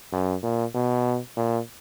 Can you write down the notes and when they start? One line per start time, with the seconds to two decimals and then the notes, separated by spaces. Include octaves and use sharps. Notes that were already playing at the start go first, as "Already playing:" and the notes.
0.13 F#2
0.43 A#2
0.75 B2
1.37 A#2